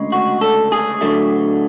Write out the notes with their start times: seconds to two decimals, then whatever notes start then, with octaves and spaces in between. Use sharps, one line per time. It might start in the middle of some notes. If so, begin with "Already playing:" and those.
Already playing: D2 C#3 G#3
0.12 F#4
0.41 A4
0.72 G#4
1.01 D2 D3 F#3 A3